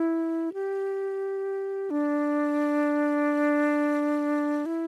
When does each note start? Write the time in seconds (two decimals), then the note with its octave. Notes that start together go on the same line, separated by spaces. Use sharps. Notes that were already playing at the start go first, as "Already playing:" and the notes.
Already playing: E4
0.53 G4
1.90 D4
4.66 E4